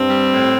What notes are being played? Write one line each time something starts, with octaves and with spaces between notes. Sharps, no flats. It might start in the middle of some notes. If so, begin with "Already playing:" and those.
Already playing: G2 C4
G3
A2